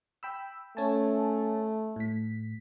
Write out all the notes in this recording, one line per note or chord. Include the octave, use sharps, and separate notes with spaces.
G5 B5 E6
A3 C#4 G#5 A5
A2 B6